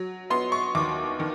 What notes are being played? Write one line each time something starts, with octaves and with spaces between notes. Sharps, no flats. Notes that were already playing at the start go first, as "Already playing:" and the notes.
Already playing: F#3
B3 C6
C#6
D#2 D6
D#3